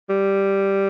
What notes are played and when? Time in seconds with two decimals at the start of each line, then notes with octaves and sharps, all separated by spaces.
0.09 G3